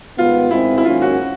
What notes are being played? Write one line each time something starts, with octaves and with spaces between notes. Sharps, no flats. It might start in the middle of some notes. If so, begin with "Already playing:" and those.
G#2 D#3 G3 B3 F4
G#2 D#3 G#3 C4 E4
E4
G#2 D#3 F#3 A#3 C#4 F4
F#4